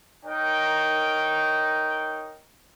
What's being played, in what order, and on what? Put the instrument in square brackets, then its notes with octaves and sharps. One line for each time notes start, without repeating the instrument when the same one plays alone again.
[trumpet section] D#4 A#4 C#5 G5